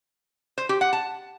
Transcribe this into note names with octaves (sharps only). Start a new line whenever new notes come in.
C5
G4
F#5
A5